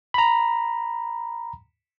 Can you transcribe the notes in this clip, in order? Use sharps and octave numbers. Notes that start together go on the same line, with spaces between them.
A#5 B5